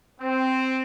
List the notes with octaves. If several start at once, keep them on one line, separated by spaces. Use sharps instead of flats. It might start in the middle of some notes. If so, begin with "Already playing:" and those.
C4